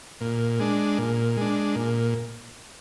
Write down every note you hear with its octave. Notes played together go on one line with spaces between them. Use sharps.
A#2
G#3 D4
A#2
G#3 D4
A#2